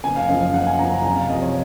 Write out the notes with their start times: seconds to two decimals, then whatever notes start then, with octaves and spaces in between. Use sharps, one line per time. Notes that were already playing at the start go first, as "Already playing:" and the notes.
0.04 F#1 G#5
0.16 F5
0.28 F#2 F3 D#5
0.41 F5
0.54 F#1 F#5
0.67 G#5
0.79 F#2 F3 A#5
0.92 A#5
1.04 C2 G#5
1.17 F5
1.29 C3 F3 D#5
1.42 C#5